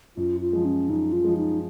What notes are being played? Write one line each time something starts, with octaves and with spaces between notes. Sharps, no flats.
F#2 F4
F4
F3 G#3
C#4
F#2 D#4
F4
F3 G#3
D#4